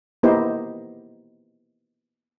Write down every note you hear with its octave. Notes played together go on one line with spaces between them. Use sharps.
A#3 B3 D#4 E4 G4 C5